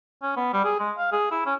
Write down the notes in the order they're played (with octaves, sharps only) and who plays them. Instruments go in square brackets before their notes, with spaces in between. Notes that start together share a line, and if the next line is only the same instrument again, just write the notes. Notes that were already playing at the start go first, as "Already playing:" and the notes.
[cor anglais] C#4
B3
G3
G#4
G#3
F5
G#4
E4
C#4